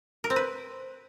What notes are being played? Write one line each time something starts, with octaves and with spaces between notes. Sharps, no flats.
A#4
C4
B4